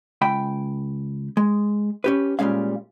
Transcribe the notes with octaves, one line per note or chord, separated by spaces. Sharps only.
C#2 G5 B5
G#3
C#4 G4 B4
A#2 G3 G#3 C#4 F5